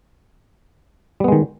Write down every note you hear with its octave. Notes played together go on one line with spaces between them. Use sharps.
D#3 G3 G#3 B3